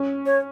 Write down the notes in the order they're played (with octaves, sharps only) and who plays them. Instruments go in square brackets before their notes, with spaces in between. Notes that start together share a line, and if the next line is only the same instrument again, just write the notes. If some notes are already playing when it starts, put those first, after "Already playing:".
Already playing: [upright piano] C#4
[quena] C#5